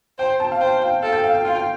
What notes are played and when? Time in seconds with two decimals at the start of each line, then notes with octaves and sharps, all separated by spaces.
0.18 C5 G5
0.40 A5
0.52 F5
0.61 C5 G5
0.82 G5
1.03 A4 F5
1.12 G5
1.24 F5
1.34 G5
1.44 F4 F5
1.55 G5